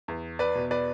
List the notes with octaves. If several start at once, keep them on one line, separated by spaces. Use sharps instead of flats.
E2
B4 D5
B2
B4 D5